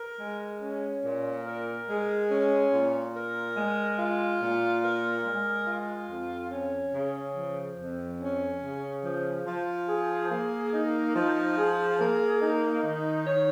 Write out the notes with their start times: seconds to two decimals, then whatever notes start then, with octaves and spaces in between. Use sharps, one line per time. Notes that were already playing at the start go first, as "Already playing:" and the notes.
Already playing: A#4
0.20 G#3
0.62 C#4
1.05 A#2
1.46 A#4
1.89 G#3
2.31 C#4
2.73 A#2
3.15 A#4
3.57 G#3
3.99 F4
4.41 A#2
4.84 A#4
5.26 G#3
5.68 F4
6.10 F2
6.52 C#4
6.94 C#3
7.36 F3
7.78 F2
8.21 C#4
8.63 C#3
9.04 F3
9.47 F3
9.88 G#4
10.31 A#3
10.74 D#4
11.16 F3
11.58 G#4
12.00 A#3
12.42 D#4
12.84 D#3
13.27 C#5